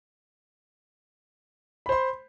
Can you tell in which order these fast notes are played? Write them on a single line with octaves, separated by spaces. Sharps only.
B5 C5 C6